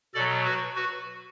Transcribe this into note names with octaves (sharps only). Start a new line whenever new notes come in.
B2 F#3 A4 D5
F#4 B4
F#4 B4